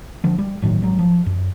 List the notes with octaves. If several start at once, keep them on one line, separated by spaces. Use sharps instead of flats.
D3 F3
G3
G1 A2 D#3 F#3
G#1 F#3
F3
F#2